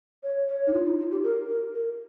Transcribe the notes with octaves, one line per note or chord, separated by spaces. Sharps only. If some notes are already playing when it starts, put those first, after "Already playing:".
C#5
C#5
D#4
F4
D#4
F4
G4
A#4
A#4
A#4